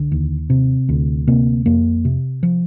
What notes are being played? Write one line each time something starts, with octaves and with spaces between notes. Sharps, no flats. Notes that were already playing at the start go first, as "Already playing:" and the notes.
Already playing: C2 D3
D#2
C3
D2
C3 A#3
F2 A#3
C3
F3